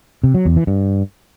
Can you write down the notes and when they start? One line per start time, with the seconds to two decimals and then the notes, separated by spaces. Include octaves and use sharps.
0.23 C3
0.34 F#3
0.45 E2
0.56 E3
0.67 G2